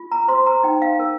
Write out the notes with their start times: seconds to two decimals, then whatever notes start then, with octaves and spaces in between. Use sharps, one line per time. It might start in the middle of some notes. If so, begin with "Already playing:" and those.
Already playing: F4
0.12 A#5
0.28 C5 C6
0.46 A#5
0.63 D#4 G5
0.82 F5
0.99 A#4